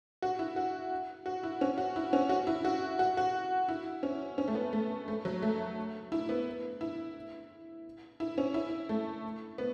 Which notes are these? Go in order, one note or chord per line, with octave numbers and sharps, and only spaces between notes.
F#4
E4
F#4
F#4
E4
C#4
F#4
E4
C#4
F#4
E4
F#4
F#4
F#4
E4
C#4
C#4
A3
B3
A3
A3
F#3
A3
E4
B3
E4
E4
C#4
E4
A3
B3